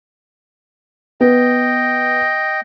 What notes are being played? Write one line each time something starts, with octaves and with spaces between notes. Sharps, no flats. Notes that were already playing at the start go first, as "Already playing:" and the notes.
B3 D#5 G5